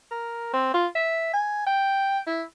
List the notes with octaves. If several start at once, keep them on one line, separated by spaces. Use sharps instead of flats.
A#4
C4
F4
E5
G#5
G5
E4